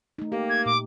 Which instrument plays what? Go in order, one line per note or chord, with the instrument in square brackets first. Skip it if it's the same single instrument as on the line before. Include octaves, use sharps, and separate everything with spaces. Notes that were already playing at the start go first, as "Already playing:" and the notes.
[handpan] A3 D#4
[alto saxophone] A#3 [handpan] G4
[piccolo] G#6
[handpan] A#2 [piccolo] D6